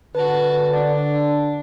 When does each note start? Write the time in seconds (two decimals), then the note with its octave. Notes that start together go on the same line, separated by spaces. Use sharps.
0.15 D3 F#4 B4 A5
0.74 D4 D5